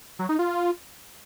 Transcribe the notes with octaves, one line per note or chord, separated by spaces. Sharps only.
F#3
D#4
F4